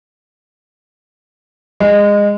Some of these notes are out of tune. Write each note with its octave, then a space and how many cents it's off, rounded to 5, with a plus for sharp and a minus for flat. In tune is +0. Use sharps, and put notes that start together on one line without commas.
G#3 -20